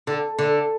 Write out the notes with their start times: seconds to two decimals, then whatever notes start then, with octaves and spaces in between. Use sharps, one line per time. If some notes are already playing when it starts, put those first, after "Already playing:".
0.07 D3
0.39 D3